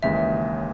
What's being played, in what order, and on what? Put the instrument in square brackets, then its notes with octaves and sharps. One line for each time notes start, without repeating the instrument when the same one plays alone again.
[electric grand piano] D#2 C#3 E3 G#3 [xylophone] E5